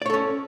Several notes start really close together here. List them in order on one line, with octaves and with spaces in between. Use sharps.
D5 C#5 A4 C#4